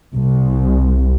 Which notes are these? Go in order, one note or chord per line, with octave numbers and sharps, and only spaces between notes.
C2